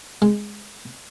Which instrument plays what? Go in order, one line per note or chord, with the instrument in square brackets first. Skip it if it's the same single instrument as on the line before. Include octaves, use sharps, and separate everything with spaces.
[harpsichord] G#3